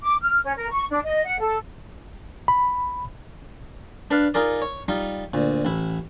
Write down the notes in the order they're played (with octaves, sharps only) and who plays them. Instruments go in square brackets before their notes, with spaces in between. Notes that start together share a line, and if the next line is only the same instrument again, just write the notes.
[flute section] D6
F6
C#4
A#4
C#6
D4
D#5
F#5
A4
[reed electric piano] B5
[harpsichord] D4 B4 D5 F5
D#4 F4 G#4 A#4 D5
C#5
G3 D#4 F4
D2 A#2
A1 E4